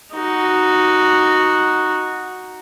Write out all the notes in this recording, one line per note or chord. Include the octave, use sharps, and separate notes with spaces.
D#4 F#4